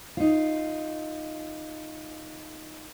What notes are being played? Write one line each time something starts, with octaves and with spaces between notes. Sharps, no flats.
D#4 F4